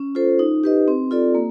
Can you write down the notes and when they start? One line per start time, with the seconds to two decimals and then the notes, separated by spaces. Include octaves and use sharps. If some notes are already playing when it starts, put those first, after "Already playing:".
Already playing: C#4
0.15 F4 A4 C5
0.39 D#4
0.64 G4 B4 D#5
0.88 C4
1.11 F4 A4 D5
1.35 A#3